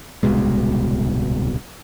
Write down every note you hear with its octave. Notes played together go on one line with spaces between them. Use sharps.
D1 C2 B2 G#3